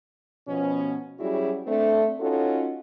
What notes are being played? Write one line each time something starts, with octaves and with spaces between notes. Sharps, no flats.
B2 F3 C#4
F#3 G3 C#4 E4 F#4 G#4
A3 C4 D4
C#4 D#4 F4 F#4 A4